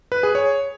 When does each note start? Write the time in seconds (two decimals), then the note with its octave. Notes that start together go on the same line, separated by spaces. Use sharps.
0.12 B4
0.23 G#4
0.35 C#5